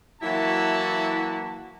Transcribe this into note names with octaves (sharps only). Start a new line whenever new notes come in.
E3 F#3 A#3 E4 F#4 A5